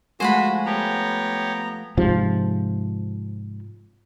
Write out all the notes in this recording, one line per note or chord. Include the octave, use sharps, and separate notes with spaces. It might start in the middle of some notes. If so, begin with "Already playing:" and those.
F3 G#3 A3 F#4 C5 F#5 G#5 B5
B3 G4 A4 C#5 A#5
G#2 C3 F3